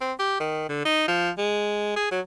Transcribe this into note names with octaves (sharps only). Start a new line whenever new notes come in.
C4
G4
D#3
D3
D#4
F3
G#3
G#4
F#3